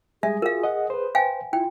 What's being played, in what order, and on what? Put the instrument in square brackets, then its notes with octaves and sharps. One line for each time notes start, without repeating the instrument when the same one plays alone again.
[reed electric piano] G3 G#3 G#5 [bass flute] G#4 [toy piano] E5
[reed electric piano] F4 F#4 [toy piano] A#4 F5
[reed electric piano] D#5 F#5
B4 C5
[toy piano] F5 G5 G#5
[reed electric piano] E4 [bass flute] F4 [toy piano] G5